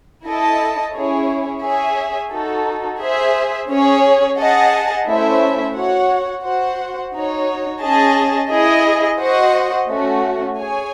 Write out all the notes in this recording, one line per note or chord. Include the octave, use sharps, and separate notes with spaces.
E4 A4 D#5 A5
C#4 E4 G#4 C#5
G#4 C#5 E5 G#5
D#4 F#4 A4
G#4 C5 E5
C#4 G#4 C#5
G#4 D#5 F#5 A5
A3 C#4 E4 C5 E5
F#4 C#5 F#5
F#4 C5 F#5
D#4 F#4 C#5
C#4 G#4 D#5 A5
E4 G#4 D#5
F#4 C5 D#5 F#5
A3 C#4 F#4
G#4 C#5 G#5